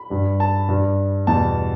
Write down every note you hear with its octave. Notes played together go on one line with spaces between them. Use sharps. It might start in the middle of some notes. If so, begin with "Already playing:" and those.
Already playing: B5
G2 G3
A5
G2 G3
E2 B2 G3 A5